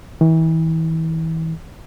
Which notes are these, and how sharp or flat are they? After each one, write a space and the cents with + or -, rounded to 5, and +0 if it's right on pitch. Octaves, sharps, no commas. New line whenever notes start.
E3 -35